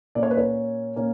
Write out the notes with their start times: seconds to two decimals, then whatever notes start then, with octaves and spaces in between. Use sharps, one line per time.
0.15 A#2 A#3 C#4 D5
0.23 C#5
0.31 B4
0.37 C#5
0.96 A#2 A#3 C#4